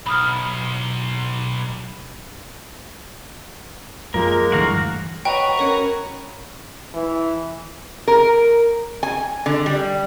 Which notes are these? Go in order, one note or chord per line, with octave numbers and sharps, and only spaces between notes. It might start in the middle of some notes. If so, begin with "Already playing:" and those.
B1 B5 D#6 F6
F#2 F3 G#3 A#3 A#4
D2 G2 E3 F#4 F5 A#5
F#4 B4 C#5 D#5 G5 A#5 F7
C#4 A#4 C#5
E3
A#4
G#5
D3
G3